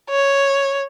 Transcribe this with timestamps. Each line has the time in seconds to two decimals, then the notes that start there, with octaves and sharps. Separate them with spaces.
0.10 C#5